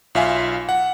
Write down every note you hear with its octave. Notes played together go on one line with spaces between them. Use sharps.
B1 F4 E5 F5 G#5
F#5